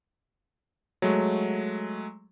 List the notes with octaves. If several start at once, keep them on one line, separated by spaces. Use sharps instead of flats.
F#3 G#3 A3